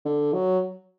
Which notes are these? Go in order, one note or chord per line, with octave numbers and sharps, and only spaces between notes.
D3
F#3